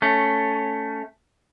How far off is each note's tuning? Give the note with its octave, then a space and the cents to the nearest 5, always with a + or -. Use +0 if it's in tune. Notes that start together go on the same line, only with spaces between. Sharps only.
A3 +0 C#4 +0